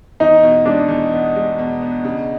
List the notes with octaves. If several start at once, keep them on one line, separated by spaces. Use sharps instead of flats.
E2 D#4
B2
G#3 D4
E2
B3
G#3
B2
B3
C#3